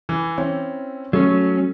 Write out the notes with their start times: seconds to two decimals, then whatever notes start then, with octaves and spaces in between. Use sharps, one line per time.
0.09 E3
0.38 C4 C#4 E4
1.13 F#3 A3 C#4